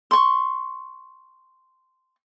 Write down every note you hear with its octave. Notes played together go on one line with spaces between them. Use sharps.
C6 C#6